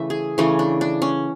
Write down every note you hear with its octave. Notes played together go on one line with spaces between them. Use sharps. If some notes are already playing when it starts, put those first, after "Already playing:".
Already playing: C#3 E3 A3 E5
G#4
C#3 E3 A3 C#4
D4
D4
C#4